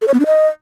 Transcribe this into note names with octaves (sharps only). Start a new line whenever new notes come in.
A4
C#5
B3
D4
D#5